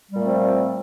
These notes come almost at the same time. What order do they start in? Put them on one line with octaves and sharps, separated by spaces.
G3 A#2 A3 C4 F3